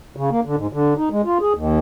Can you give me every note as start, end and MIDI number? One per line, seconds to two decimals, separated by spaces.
0.17 0.30 49
0.31 0.40 58
0.45 0.56 50
0.57 0.67 44
0.73 0.94 50
0.97 1.09 63
1.12 1.22 56
1.25 1.38 65
1.41 1.53 68
1.54 1.79 39